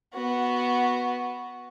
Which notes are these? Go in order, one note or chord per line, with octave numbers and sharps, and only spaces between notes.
B3 F#4